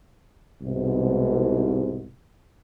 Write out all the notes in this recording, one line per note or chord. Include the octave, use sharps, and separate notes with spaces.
C2 G#2 B2